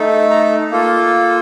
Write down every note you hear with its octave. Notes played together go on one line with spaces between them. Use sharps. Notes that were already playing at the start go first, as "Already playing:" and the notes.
Already playing: A3 D#4 A4
A#5
A#3 F4 A4